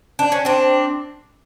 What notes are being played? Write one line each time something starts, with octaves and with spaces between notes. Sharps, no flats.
D4
C#4
C4 D4